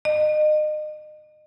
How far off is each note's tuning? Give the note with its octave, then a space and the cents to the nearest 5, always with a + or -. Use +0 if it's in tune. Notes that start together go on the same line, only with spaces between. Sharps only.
D#5 -35